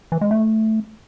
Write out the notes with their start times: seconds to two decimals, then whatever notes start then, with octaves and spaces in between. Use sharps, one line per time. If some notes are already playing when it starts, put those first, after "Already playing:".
0.12 E3
0.21 G#3
0.31 A3